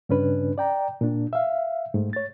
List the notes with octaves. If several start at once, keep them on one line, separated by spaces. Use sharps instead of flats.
G2 C#3 C#4 D4 B4
D5 G5 A#5
A#2 D4
E5 F5
G#2 A3
C#5 A6